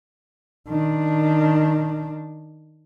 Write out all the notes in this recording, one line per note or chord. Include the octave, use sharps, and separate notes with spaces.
D#3 D4